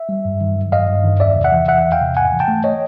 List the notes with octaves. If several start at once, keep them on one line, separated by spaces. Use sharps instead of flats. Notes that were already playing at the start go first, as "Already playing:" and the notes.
Already playing: E5
G3
G2
D#3
F#3
G2 D#5 F5
G2
D#3
E2 D5 E5
C3
E5 F#5
E3
E2 E5 F#5
E2
F5 G5
C3
G#2 F#5 G#5
E3
G5 A5
A3
C#5 D#5